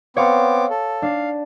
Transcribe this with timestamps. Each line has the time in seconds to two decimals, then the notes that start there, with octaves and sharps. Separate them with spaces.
0.17 B3 C4 C#5 F5 D6
0.70 A4
1.02 D4 F5